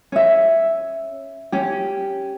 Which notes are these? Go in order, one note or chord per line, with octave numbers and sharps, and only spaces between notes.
C#4 E5
C#4 G4